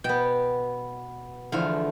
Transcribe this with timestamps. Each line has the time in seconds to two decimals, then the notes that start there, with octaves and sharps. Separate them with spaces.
0.04 B2 B3 G5
1.52 E2 D3 F3 A3 F5